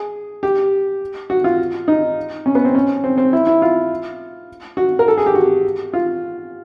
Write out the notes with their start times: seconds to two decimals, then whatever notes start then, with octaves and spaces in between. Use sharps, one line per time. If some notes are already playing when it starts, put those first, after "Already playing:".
Already playing: G#4
0.43 G4
1.30 F#4
1.44 F4
1.88 D#4
2.46 C#4
2.55 B3
2.65 C4
2.75 C#4
3.04 C4
3.18 C4
3.33 E4
3.47 E4
3.62 F4
4.77 F#4
4.99 A#4
5.08 A4
5.17 G#4
5.26 G4
5.35 F#4
5.94 F4